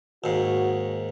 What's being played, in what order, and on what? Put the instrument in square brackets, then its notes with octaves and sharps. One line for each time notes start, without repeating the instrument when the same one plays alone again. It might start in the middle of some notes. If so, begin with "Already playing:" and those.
[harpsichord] D#2 G#2 [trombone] F#4